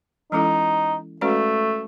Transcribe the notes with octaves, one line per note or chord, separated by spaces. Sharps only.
E3 G#3 C#4 D#4 E4 A4
G#3 A3 C#4 F#4 B4 D5